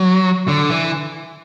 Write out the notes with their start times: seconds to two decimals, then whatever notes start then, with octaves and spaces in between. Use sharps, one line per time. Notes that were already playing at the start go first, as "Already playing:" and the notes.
Already playing: F#3
0.48 D3
0.70 E3